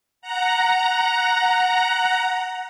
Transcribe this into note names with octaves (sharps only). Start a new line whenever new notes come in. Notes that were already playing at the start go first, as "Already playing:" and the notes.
F#5 A#5